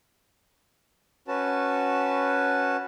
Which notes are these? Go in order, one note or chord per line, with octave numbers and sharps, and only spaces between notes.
C#4 F#4 B4 A5